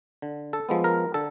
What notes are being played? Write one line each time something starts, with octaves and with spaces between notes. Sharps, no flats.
D3
A4
F3 G#3 B3
A#4
D3 A4